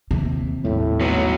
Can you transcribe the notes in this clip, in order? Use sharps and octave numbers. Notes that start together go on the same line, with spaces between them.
D#2 C3 E3
G#1 D#2 A2 G3
F#3 B3